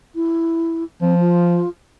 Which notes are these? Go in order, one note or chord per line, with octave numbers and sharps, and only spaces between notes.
E4
F3 C4
F4